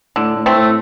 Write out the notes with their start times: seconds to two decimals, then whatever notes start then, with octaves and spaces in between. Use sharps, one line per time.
0.16 A2 D3
0.36 A2
0.46 A3 C4
0.55 A2